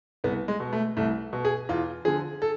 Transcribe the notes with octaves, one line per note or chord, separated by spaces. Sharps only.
C2 B3
G#3
B2
A3
C2 A3
B2
G#4
E2 F4
D3 F3 G#4
A4